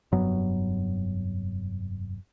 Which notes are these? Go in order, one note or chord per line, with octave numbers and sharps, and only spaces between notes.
F1 G2 F#3 B3